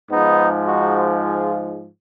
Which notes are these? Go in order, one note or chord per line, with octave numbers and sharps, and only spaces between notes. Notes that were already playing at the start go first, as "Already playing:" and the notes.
G#2 F3 G#3 B3 D#4
D#4 F#4
F4 G#4